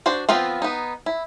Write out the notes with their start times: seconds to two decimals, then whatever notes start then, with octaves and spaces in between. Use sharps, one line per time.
0.06 D4 F#4 C5
0.29 F3 B3 C4 F4
0.62 B3 D#4
1.06 E4